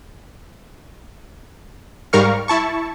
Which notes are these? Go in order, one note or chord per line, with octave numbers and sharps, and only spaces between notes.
G#2 G3 A#4 F5 C#6 F6
E4 A5 C#6